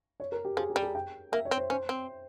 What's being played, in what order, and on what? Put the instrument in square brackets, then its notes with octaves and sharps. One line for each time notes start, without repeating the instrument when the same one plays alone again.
[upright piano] C#5
A#4
G4
[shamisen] F3 [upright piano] G#4
[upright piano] G4
[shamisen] G3
[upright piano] G#4
G5
[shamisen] A#3 [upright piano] E5
[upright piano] C#5
[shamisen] C4
[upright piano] C5
[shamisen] C#4 [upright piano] C5
[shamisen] C4